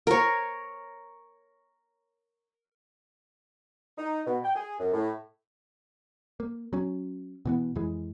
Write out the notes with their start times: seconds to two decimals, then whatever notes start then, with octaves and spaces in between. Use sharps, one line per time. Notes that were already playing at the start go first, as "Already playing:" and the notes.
0.07 A#4 C#5
3.98 D#4
4.26 B2
4.43 G5
4.55 G#4
4.79 F#2
4.93 A2
6.40 A#3
6.73 F#3 C#4
7.46 B2 E3 B3
7.75 F2 E3 G#3